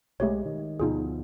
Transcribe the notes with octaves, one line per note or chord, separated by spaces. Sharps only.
B1 G#3 A3 G4 C#5
D#3
D2 B2 F3 D#4 F4 G#4